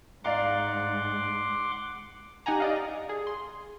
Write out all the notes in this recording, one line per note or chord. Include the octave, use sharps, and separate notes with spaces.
G#2 D5 F5 F#5 A#5 C6 D6
D#4 G4 F#5 G#5 A#5
D5 D#5 F5
G#4
C6